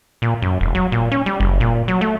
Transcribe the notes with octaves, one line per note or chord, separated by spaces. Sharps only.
A#2
F#2
E1
F#3
A#2
C#4
G3
F#1
A#2
F#3
A3